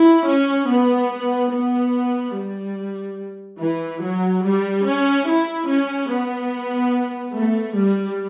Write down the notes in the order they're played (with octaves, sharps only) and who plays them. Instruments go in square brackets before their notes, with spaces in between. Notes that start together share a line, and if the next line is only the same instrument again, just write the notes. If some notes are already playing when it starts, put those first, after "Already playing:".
Already playing: [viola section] E4
C#4
B3
B3
G3
E3
F#3
G3
C#4
E4
C#4
B3
A3
G3